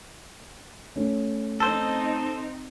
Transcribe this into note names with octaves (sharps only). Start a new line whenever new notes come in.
A3 C#4
C4 D#4 A4 C5